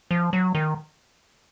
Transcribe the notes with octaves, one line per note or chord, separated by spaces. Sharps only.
F3
F#3
D#3